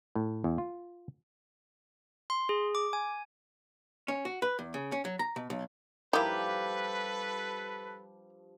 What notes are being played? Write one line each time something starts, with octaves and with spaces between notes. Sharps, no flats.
A2
E2
F4
C6
G#4
D6
G#5
C#4
F#4
B4
E2
C#3
C#4
F#3
A#5
B2
B1
G2 F3 A#3 D#4 E4 G4 A4 B4